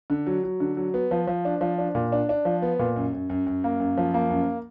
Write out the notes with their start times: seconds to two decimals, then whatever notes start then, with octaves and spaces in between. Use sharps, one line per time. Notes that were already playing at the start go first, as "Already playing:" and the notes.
0.10 D3
0.27 F#3
0.43 F#3
0.60 D3
0.77 F#3
0.94 B3
1.11 F3
1.27 F3
1.45 D4
1.61 F3
1.78 D4
1.95 A#2
2.12 D4
2.29 D4
2.45 F3
2.62 B3
2.79 A#2
2.96 F#2
3.13 F#2
3.30 F#2
3.47 F#2
3.64 A#3
3.80 F#2
3.97 F3
4.14 A#3
4.30 F#2